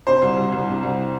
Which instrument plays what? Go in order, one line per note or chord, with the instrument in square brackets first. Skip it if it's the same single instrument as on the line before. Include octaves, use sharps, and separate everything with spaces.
[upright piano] C3 C5
C2
C2
C2
C3
C2